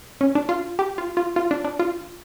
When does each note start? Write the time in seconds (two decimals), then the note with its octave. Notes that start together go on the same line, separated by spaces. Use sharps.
0.21 C#4
0.35 D4
0.49 F4
0.79 G4
0.98 F4
1.17 F4
1.36 F4
1.51 D4
1.65 D4
1.79 F4